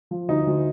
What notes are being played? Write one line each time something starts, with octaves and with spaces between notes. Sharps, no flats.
F3
D2 D#4
D2